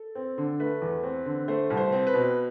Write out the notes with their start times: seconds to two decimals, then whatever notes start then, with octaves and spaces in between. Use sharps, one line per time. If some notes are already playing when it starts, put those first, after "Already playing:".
Already playing: A4
0.15 C4
0.38 D3
0.60 A3 B4
0.81 E2
1.03 C4
1.26 D3
1.48 A3 C5
1.70 C2
1.77 C5
1.92 C4
2.07 B4
2.14 B2